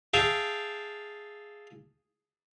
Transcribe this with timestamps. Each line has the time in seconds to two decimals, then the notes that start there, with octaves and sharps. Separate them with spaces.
0.14 G#4 E5 F5 G5 A5